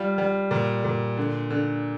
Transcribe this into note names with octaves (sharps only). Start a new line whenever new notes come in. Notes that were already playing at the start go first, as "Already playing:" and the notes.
Already playing: G3 F4
G3
A#2
A#2
D3
D3